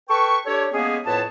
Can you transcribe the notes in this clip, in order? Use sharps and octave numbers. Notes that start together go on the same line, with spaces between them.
A4 B4 G5 C#6
D4 G4 A4 C#5
G#3 A#3 B3 C#4 G#4
F2 A2 B3 B4 C#5 A5